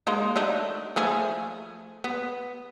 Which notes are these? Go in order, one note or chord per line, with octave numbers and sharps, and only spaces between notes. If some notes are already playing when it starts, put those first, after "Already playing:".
G#3 A#3 D#4
A3 D4 D#4
F3 A3 G#4
B3